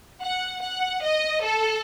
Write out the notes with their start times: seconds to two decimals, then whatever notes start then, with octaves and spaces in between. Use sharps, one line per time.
0.21 F#5
0.62 F#5
1.03 D#5
1.44 A4